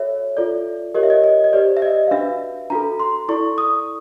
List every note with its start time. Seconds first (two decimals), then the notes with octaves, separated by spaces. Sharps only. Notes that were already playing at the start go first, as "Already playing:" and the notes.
Already playing: F#4 A4 C#5 E5
0.37 F4 A4 D5
0.94 G4 A#4 C#5 D#5
1.03 E5
1.10 D#5
1.24 D#5
1.44 D#5
1.53 G4 C5 D5
1.77 E5
1.82 D#5
2.07 F5
2.11 D4 F#4 B4 E5
2.70 D4 F#4 A4 A#5
3.00 C6
3.29 E4 A4 D5 C#6
3.58 D#6